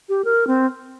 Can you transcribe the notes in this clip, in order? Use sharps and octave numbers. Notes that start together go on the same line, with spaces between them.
G4
A#4
C4